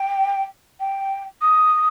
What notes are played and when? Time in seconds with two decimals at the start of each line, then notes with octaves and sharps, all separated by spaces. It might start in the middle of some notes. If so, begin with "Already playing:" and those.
Already playing: G5
0.80 G5
1.41 D#6